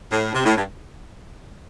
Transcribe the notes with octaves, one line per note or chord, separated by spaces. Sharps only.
A2
C3
A2
G2